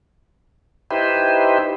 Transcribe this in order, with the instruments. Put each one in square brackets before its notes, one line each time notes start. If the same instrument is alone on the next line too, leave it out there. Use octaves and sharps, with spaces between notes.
[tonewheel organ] D#4 E4 G4 B4 C5